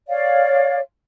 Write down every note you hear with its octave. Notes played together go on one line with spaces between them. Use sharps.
C#5 D5 F5